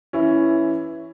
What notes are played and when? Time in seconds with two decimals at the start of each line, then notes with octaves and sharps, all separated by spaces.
0.13 E3 C#4 E4